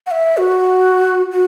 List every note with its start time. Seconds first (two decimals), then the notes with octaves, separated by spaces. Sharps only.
0.06 F#5
0.11 E5
0.37 F#4
1.31 F#4